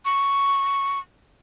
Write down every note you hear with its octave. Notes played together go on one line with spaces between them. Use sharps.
C#6